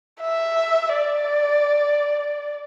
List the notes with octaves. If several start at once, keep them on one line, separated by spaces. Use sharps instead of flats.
E5
D5